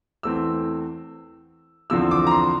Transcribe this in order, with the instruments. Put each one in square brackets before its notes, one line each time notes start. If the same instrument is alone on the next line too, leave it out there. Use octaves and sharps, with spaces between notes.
[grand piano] E2 E3 A3 C4 E6
E2 D3 F3 C4 E6
D6
A#5
C6